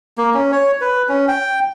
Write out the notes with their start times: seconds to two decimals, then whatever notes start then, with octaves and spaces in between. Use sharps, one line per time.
0.18 A#3
0.34 C#4
0.52 C#5
0.81 B4
1.09 C#4
1.28 G5